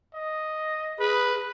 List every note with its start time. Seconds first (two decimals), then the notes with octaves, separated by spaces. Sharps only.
0.14 D#5
0.99 G#4 B4